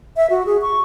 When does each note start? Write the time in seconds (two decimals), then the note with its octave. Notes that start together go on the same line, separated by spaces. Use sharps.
0.16 E5
0.30 F#4
0.46 G#4
0.62 C#6